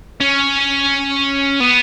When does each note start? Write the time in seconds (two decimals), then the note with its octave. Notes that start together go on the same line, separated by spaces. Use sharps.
0.21 C#4
1.60 B3